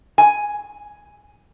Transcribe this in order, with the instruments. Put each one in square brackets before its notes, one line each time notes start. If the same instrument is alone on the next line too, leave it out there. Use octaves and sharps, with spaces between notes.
[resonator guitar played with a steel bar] G#5